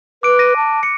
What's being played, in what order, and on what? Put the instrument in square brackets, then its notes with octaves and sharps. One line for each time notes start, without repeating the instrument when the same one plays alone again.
[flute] B4 [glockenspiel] D6 F#6 D7
[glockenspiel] A#6 D#7
[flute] A5
[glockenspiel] C#7